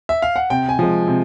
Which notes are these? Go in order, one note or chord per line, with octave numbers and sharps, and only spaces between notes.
E5
F5
F#5
C3 G5
G#5
F3 G#3
C3